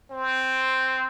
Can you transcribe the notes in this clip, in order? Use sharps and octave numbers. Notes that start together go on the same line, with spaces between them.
C4